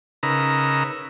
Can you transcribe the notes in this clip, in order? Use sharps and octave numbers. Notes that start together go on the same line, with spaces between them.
C#3 D#4 A#4 B4 A#5 E6